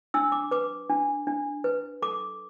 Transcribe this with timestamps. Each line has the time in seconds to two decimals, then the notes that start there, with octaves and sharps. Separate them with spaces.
0.14 D4 E6
0.32 D6
0.51 B4 D6
0.90 D4
1.27 D4
1.64 B4
2.02 A4 D6